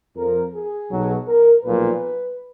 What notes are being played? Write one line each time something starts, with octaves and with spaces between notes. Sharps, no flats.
F2 F3 A#4
G#4
B1 B2 F#3
A#4
B1 A#2 F3 B4